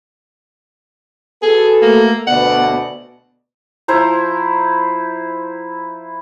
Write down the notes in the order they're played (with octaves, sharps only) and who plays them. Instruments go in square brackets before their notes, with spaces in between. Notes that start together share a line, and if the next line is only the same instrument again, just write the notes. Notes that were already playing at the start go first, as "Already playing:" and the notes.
[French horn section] B3 F#4 A4 [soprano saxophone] G#4
[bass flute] A3 [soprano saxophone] A#3
[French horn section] D2 B2 D5 [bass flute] B3 [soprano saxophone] F#5
[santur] F3 E4 C5 A#5